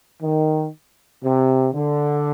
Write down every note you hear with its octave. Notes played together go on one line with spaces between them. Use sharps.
D#3
C3
D3